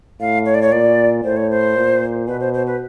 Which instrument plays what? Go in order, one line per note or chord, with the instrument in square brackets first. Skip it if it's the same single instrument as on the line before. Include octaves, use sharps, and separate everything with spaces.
[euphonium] A2 [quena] F5
[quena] C#5
D5
C#5
[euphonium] A#2 [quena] D5
[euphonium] A2 [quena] C5
[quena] C#5
C5
[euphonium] A#2
[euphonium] B2 [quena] B4
[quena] C5
C5
B4